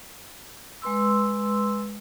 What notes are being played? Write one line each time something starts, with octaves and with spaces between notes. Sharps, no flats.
G#3 B4 C6 E6